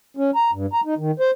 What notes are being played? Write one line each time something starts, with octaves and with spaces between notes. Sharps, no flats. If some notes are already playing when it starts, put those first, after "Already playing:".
C#4
A#5
G2
A#5
D#4
D#3
C5